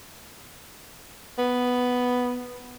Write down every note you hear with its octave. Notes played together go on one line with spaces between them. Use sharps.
B3